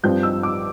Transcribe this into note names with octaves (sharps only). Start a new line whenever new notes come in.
G2 F3 C4 G6
E6
D6